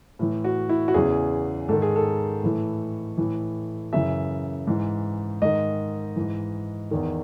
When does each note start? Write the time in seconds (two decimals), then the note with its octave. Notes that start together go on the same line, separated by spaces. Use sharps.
0.19 A2 E3
0.44 F#4
0.69 E4
0.88 F#4
0.94 E2 C#3 E3 G#4
1.69 G#2 D#3 A4
1.82 G#4
1.96 A4
2.43 A2 E3
3.18 A2 E3
3.93 F#2 C#3 E3 E5
4.67 G#2 E3
5.42 G#2 D#3 D#5
6.16 G#2 E3
6.91 E2 D#3